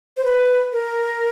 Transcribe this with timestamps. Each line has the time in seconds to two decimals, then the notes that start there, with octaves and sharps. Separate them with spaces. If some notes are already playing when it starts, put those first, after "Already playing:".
0.17 C5
0.25 B4
0.72 A#4